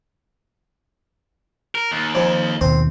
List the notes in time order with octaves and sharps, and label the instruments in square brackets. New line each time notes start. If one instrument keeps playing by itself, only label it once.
[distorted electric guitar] A#4
D#2
[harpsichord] F2
[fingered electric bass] D#2 B2 [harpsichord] C4